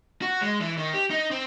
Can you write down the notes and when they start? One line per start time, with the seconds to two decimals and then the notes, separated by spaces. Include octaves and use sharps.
0.22 F#4
0.41 G#3
0.60 E3
0.77 D#3
0.93 G4
1.10 D#4
1.31 C4